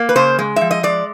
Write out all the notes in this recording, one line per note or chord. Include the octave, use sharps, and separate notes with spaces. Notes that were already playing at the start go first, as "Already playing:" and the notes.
Already playing: A#3
B4
C#3 C5
G#3
F3 E5
D#5
G#3 D5